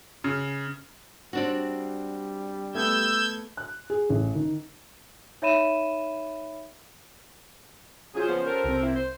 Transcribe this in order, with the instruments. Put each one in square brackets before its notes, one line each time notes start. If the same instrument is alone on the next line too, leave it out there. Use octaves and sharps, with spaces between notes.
[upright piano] C#3
[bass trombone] G3 [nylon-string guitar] C4 D4 F#4
[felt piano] A3 B3 [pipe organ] E6 G6 G#6
[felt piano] F#6
G#4
A1
D#3
[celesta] D#4 C#5 E5 B5 D#7 E7
[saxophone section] C3 F#3 G#4 [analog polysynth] C#4 F4 C5
[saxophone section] C#3 F3 B3
G4 A4 A#4
[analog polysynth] C2 C4
[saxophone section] A#3 E4
C5